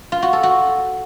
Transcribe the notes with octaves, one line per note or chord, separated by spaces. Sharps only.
F4
F#4
A4
F#4